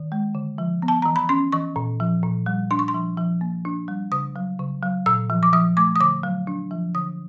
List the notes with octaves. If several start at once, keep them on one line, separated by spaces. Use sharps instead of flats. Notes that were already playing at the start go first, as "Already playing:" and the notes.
Already playing: D#3
G#3
D3
F3
B3
A5
E3 A#5
B5
C#4 C6
E3 C#6
A#2
F3
A#2
G3
D4 C6
C#6
C6
F3
F3
A#3
D4
G3
C#3 D#6
F#3
C#3
F#3
A#2 E6
F3
D6
F3 D#6
A3 D6
D#6
D3 D6
F#3
D4
F3
D3 D#6